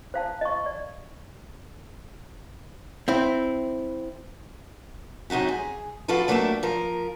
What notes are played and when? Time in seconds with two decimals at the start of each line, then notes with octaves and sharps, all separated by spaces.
0.14 C5 F5 A5
0.41 D#5 C#6
0.66 D5
3.08 C4 E4
5.30 F#2 C3 D#4 F#4 G4
5.48 G#4
6.08 F3 F4 F#4 A4 B4
6.28 F#3 A3 A#3 D4 G4 E5
6.63 F3 A#4